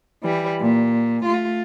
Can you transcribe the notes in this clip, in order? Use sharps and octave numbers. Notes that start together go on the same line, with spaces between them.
E3 G3
A#2
A3 F4